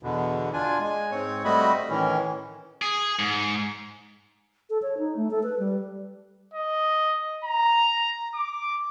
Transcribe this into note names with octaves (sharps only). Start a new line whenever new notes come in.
E2 B2 D3
D4 F4 G#5
G#3 G#5
G#2 C4 C#5
G3 A3 C4 F#4 D#5 B5
A2 D#3 E3 C#4
G#4
G#2
A4
C#5
D#4
A3
A4
B4
G3
D#5
A#5
D6